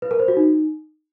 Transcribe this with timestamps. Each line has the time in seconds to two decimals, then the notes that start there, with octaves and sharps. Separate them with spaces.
0.02 B4
0.11 A#4
0.19 C5
0.28 F#4
0.37 D#4